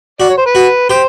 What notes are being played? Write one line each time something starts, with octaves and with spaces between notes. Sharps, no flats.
F#4 D5
C#5
C5
B4
F#4
G4 C5